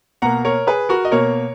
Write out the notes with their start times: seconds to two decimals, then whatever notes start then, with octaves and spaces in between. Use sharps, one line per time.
0.22 B2 A#3 F#5 A#5
0.45 A#4 C#5
0.67 G#4 B4
0.89 F#4 A#4
1.05 D#5
1.11 B2 A#3 A#4 C#5